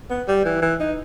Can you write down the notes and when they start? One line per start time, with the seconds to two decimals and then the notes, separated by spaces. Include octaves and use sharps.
0.10 B3
0.28 G3
0.45 E3
0.62 E3
0.80 D#4